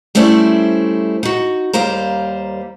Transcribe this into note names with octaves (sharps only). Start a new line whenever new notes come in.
G3 A3 C#4 E4 C5 D5
D#4 F#4
D#2 G3 A#3 C5 A#5